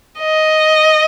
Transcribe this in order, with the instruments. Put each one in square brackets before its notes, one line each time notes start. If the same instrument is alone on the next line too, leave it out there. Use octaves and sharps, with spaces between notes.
[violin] D#5